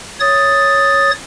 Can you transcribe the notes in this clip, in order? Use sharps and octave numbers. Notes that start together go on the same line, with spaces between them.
C#5 D#6 A6